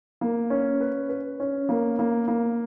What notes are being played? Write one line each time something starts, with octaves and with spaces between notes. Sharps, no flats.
A#3
C#4
B4
B4
C#4
A#3
A#3
A#3